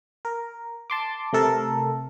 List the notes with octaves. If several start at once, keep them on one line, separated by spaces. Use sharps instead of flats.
A#4
A5 C6 D6
C3 A3 A4 A#4